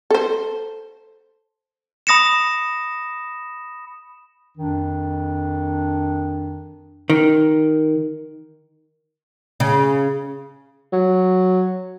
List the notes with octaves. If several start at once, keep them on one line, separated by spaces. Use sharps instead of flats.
A4 C5
B5 D#6 A#6 C#7 E7
F2 D#3 D4
D#3
C#3
F#3